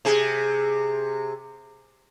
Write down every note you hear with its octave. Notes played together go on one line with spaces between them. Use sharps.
C3 G#4